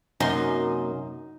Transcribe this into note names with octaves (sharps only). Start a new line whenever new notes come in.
F#2 C3 A#3 D#4 C6